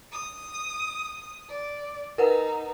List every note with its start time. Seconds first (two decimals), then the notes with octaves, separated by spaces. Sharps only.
0.11 D#6
1.49 D5
2.18 D#4 A#4 B4 F#5